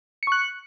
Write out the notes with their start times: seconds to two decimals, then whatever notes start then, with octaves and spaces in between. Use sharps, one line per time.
0.23 C#7
0.27 C#6
0.32 F#6